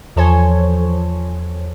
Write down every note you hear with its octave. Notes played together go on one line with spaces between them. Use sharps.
E2 F3 A4 C5 C#5 G#5